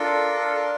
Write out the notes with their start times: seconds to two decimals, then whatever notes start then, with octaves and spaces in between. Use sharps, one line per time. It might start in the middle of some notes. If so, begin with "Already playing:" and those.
Already playing: D4 F4 A4 A#4
0.40 A4
0.55 A#4